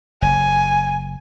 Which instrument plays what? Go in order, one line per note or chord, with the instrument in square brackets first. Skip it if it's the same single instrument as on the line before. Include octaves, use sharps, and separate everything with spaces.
[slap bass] F#1 [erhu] G#5